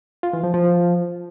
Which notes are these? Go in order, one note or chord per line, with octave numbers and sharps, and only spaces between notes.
F4
E3
F3
F3